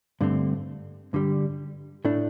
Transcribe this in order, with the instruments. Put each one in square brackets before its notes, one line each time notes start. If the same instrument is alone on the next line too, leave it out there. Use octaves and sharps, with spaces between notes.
[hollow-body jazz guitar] G2 D3 A3 C4
G2 D3 G3
A2 A3 D4